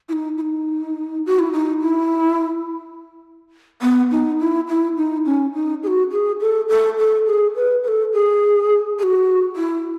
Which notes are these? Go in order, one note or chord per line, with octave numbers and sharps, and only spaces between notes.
E4
D#4
E4
D#4
F#4
E4
D#4
E4
B3
D#4
E4
E4
D#4
C#4
D#4
G#4
F#4
G#4
A4
A4
A4
G#4
B4
B4
A4
G#4
G#4
F#4
E4